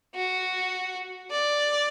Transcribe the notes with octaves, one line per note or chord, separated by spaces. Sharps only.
F#4
D5